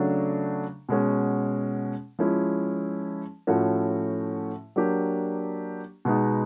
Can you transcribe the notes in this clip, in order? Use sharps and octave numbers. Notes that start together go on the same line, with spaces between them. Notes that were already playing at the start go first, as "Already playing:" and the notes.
Already playing: C#3 F#3 A3 D4 F#4
B2 G#3 C#4 F#4
F3 G#3 C#4 E4
A2 F3 A3 C#4 F#4
F#3 A#3 D4 G4
B2 G#3 B3 D#4